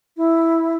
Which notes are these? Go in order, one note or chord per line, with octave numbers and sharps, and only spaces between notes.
E4